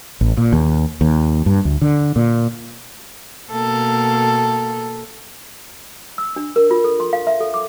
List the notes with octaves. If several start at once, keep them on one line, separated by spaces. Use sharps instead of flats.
A1
A#2
D#2
D#2
G2
D2
D3
A#2
B2 A#3 A4
E6
D4
A#4
F4
A4
C6
F5
E5
A4
D6